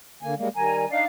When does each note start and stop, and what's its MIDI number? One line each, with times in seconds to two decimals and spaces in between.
0.23 0.34 50
0.23 0.34 58
0.23 0.34 80
0.37 0.48 55
0.37 0.48 56
0.37 0.48 58
0.55 0.85 51
0.55 0.85 55
0.55 0.87 80
0.55 0.87 82
0.90 1.05 62
0.90 1.05 63
0.90 1.06 74
0.90 1.06 77